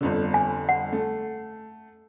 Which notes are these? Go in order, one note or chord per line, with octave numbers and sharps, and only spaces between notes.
G1 F2 D3
G#5
F#5
A3